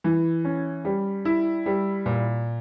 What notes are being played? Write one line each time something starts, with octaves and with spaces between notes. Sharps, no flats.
E3
C#4
G3
E4
G3
A#2